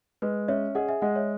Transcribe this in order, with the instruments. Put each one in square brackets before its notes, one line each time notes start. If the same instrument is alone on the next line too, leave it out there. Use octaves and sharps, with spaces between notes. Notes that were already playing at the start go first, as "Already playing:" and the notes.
[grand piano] G#3 [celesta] B4
[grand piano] C#4 [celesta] C#5 E5
[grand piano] G#4 [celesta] D#5 F#5
[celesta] E5 G#5
[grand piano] G#3 [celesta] D#5 F#5
[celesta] C#5 E5